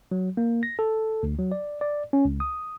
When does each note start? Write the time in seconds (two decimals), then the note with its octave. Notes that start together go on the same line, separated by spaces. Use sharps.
0.11 F#3
0.37 A#3
0.63 A#6
0.79 A4
1.23 D2
1.39 F#3
1.52 D5
1.81 D5
2.13 C#4
2.25 C#2
2.40 D#6